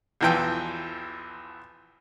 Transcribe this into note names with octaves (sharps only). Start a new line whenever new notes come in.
B1 E2 E3 F3 G5